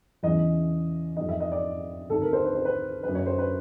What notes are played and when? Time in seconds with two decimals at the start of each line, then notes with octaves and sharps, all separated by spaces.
0.23 E2 C#3 E3 D#5
1.16 F2 C3 D#3 D#5
1.29 E5
1.40 D#5
1.52 D5
2.10 D2 C3 D#3 A4
2.22 A#4
2.33 C5
2.45 B4
2.55 C5
2.65 B4
3.03 F#2 D3 B4
3.15 C#5
3.26 C5
3.38 B4